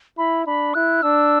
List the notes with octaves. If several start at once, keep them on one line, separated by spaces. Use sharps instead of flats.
E4 B5
D4 B5
E4 F#6
D4 E6